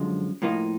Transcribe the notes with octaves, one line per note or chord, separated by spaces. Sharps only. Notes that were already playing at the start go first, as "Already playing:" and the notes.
Already playing: F#2 D3 F3 G#3
A2 F3 A#3 D#4